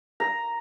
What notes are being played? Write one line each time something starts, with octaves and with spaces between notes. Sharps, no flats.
A#5